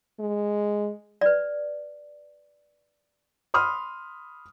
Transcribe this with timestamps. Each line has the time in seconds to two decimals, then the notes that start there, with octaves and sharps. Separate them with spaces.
0.20 G#3
1.21 B4 D5
3.54 B5 C6 D#6 F6